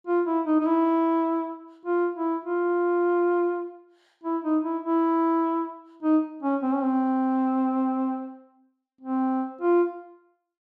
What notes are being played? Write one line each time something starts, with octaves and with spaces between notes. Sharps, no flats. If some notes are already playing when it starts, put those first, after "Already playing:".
F4
E4
D#4
D#4
E4
F4
E4
F4
E4
D#4
E4
E4
D#4
C#4
C4
C#4
C4
C4
F4